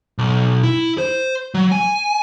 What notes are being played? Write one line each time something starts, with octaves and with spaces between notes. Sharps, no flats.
B1
E4
C5
F#3
G#5